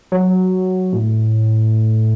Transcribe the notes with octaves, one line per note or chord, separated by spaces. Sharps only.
F#3
A2